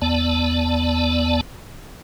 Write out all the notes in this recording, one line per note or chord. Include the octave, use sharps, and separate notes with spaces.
E2 B3 D5 A5